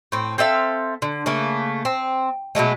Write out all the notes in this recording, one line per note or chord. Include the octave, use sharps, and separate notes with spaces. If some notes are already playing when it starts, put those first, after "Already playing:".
A2 C4
C4 A4 E5 F5
D3
C#3 A3 A#3
C4
B2 F#3 G#3 A3